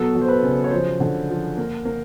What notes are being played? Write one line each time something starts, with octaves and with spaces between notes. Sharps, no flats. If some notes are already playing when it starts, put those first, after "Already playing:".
Already playing: B2 F#3 B3 A4
F#3
C5
B4
C#3
C#5
F3 C5
D3
F3
A#3
A#3